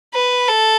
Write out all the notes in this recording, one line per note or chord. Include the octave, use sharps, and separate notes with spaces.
B4
A4